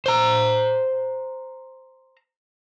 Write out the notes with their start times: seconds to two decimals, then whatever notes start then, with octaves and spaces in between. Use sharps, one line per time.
0.06 C5 A#5